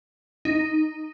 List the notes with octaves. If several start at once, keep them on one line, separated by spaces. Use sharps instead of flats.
D#4